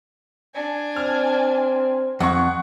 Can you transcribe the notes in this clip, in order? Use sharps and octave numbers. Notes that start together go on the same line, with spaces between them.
D4 G#5
C4 F6
F2 F#5 C#6